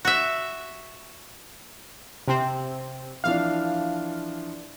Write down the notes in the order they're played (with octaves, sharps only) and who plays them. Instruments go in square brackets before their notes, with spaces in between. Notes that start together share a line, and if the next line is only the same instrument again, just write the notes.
[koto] F#4 E5
[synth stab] C3 C4
[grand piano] E3 F3 D4 [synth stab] F5